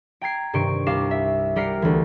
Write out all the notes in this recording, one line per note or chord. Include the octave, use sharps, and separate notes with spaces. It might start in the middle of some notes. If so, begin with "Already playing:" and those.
G5 A#5 G#6 C7
G2 C3 D#3 C5 C#6 D7
C2 F5 D6 C7 E7
E5
G3 G4 A#4 F#5 C7
D2 E3